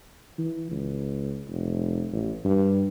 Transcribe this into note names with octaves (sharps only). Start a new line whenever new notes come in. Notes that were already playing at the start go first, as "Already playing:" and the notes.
E3
C#2
F1
A1
G2